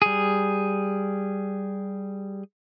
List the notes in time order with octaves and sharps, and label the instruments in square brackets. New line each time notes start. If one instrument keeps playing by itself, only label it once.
[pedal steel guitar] G3 G#4